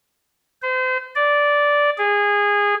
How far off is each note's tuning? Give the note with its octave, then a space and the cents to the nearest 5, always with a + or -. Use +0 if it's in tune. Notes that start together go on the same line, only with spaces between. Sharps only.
C5 -35
D5 -10
G#4 -20